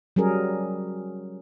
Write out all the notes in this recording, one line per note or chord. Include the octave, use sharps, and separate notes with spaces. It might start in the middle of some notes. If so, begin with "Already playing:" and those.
F#3 G3 C#4 G#4 A#4